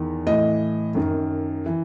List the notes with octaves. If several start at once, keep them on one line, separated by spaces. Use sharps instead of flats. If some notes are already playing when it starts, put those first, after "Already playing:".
Already playing: E2 D#3
A2 E3 D#5
F#2 D#3
E3